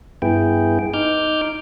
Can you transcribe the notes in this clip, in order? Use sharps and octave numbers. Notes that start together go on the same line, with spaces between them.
G2 B3 E4 G#4 G5
D#4 D6 F6 G6